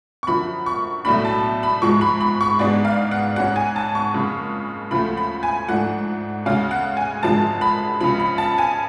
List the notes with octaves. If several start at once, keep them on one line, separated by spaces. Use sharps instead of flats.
C#6
F#2 D3 F3 B5
C#6
B1 A2 F#3 A3 D4 B5
A5
B5
G#2 F3 G#3 C#6
B5
B5
C#6
G#2 G#3 B3 D4 D5
F5
F#5
G#2 G#3 C#4 F#5
G#5
A5
C#6
F#1 F2 C#3 G#3
D2 C#3 F3 A3 B5
B5
G#5
G#2 F3 A3 D4 F#5
D2 C#3 G#3 C#4 F5
F#5
G#5
G#1 F#2 D3 F3 G#3 A5
B5
C#2 C#3 F3 B5
B5
A5
G#5